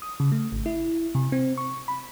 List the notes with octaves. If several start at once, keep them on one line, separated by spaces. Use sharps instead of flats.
D#6
C#3
A3
G#1
E4
C3
C4
C#6
B5